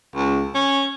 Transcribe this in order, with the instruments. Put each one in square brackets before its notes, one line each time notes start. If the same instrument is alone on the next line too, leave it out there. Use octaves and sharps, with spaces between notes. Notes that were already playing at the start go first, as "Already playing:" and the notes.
[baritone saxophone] C#2
C#4